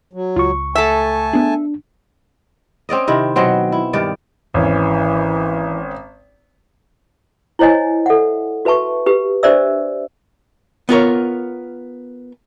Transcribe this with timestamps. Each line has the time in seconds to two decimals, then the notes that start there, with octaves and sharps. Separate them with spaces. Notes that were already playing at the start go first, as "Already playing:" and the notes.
0.13 F#3
0.36 C#2 F4 C#6
0.75 A3 A4 E5 G#5 A5
1.33 B3 D4 G#4
2.89 C4 C#4 D5 D#5
3.08 C3 D#3 E4
3.36 B2 F#3 C4 C5
3.72 E4
3.93 G2 D#3 D5
4.54 G#1 E3 C#4
7.59 E4 C5 C#5 D#5 G#5
8.06 A4 E5 F#5
8.65 F#4 B4 E5 A5 C#6
9.06 G4 B4
9.43 D4 G4 C5 D5 E5 E6
10.89 B3 F4 A#4 C#5